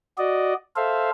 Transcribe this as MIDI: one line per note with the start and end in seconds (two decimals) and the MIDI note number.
0.18 0.54 66
0.18 0.54 74
0.18 0.54 75
0.76 1.11 69
0.76 1.11 72
0.76 1.11 76
0.76 1.11 77